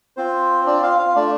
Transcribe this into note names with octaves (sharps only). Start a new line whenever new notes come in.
C4 F4 C5
D4 D5
F4 F5
F4 F5
A3 D4 F4 D5